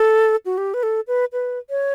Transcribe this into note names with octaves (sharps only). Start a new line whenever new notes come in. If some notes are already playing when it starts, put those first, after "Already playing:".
Already playing: A4
F#4
G4
B4
A4
B4
B4
C#5